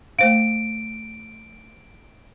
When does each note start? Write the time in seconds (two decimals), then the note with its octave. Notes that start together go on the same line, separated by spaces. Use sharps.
0.19 A3 C5 F5 D7